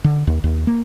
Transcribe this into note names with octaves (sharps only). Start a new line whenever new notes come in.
D3
D#2
D#2
A#3